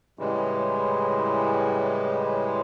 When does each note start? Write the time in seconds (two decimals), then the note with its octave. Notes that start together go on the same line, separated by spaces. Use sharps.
0.19 A2 C#3 E3 G3 G#3